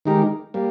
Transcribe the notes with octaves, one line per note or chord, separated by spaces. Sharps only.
D#3 G#3 D#4 G4 A#4
G3 A#3